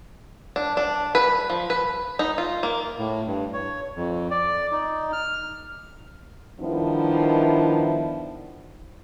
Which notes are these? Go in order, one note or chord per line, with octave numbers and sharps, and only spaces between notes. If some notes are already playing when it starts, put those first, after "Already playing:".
D4
D4
B4
F3
B4
D#4
F4
A#3
A2
G2
C#5
F2
D5
D#4
F6
D#3 F3 G3 B3 D4 E4